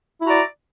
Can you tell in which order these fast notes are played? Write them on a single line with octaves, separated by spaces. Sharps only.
E4 F#4 A#5 D5